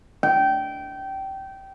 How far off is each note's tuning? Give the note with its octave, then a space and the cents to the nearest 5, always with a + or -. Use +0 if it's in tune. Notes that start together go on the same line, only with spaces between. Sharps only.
G5 -20